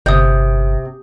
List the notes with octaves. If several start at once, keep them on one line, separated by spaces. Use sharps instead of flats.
G1 C3 D#6 G6